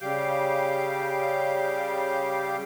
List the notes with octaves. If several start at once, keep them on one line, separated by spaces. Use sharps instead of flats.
C#3 G3 G4 F5 D6 G6